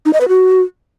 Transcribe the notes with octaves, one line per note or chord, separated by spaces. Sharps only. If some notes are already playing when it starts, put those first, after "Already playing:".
D#4
D#5
B4
F#4